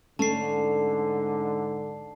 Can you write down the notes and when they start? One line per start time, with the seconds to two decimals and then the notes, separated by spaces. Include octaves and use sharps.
0.19 G#2 D3 A3 C#4 A5 C7